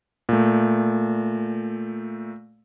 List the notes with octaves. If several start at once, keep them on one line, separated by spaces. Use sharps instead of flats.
A#2 A3